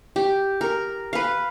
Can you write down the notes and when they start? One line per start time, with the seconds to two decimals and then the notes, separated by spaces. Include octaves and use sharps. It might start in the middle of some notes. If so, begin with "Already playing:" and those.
0.16 G4
0.61 A#4
1.13 B4 F5